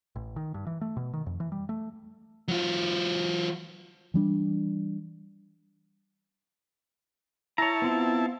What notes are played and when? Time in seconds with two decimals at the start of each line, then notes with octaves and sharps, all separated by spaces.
0.16 A1
0.36 D#3
0.54 G2
0.67 E3
0.81 A3
0.97 B2
1.13 D#3
1.26 F2
1.40 E3
1.52 G3
1.69 A3
2.48 F#3 F4
4.14 E3 G3 D4
7.58 E4 C#5 A5 A#5
7.82 B3 C4 F4